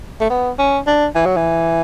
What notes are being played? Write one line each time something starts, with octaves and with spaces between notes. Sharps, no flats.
A3
B3
C#4
D4
E3
F#3
E3